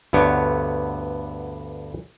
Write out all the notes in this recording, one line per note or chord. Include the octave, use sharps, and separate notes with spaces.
D2 G2 D3 B3 C#5 G5